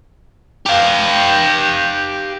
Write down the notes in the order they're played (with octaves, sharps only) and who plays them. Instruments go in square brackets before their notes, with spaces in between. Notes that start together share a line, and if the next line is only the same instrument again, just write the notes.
[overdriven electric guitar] G4 F5